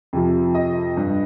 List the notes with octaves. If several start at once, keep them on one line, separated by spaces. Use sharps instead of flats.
F2 C3 F3
D#5
G2 G3